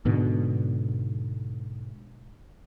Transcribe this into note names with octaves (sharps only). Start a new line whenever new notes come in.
G#2 B2 D3